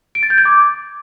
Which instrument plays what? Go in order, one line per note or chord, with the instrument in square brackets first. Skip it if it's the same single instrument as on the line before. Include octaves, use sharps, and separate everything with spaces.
[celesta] D7
A6
G6
G#6
D6